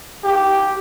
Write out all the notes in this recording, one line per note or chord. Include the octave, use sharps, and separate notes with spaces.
G4